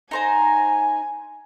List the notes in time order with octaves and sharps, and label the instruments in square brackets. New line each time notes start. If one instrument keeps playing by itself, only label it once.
[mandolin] D#4 C5 A#5 [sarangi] G#5